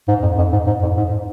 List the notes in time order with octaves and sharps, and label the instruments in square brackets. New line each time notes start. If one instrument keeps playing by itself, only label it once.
[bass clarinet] G#2
F2
F2
G#2
G#2
F2
G#2